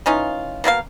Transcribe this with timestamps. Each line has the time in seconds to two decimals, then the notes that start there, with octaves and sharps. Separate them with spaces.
0.06 E3 C#4 D#4 F4
0.64 B2 A#3 E4 F5